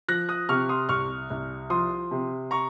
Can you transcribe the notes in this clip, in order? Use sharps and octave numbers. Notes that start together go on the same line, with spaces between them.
F3 F#6 A#6
D#6 F#6
C3 C#6 F6
C6 D#6
C2 C#6 F6
C2
F3 C6 D#6
C3
A#5 C#6